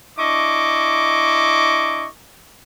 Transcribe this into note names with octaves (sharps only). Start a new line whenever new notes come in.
D4 E4 D#5 C#6 D6